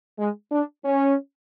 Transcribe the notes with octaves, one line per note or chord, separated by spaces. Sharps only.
G#3
D4
C#4